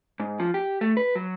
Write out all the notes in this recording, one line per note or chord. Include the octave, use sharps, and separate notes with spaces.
G#2
F3
G4
A3
B4
F#3